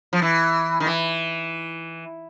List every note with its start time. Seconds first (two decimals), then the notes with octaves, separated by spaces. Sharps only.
0.13 F3
0.22 E3
0.80 D#3
0.87 E3